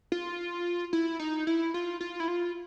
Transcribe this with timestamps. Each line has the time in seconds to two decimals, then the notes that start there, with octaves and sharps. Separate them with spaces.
0.12 F4
0.93 E4
1.19 D#4
1.47 E4
1.74 F4
2.01 F4
2.20 E4
2.28 F4